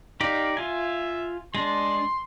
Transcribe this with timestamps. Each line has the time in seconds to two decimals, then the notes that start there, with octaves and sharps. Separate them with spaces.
0.21 D#4 G4 D5 F5
0.57 F4 E5 G#5
1.55 G#3 D4 C6